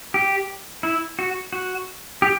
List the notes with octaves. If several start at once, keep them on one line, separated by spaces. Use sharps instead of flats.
G4
E4
F#4
F#4
G4